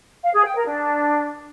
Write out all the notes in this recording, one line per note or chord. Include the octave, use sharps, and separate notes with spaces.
F5
G#4
G5
A#4
D4